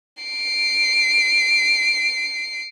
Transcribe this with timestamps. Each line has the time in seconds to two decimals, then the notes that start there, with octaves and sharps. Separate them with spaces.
0.23 C7 D7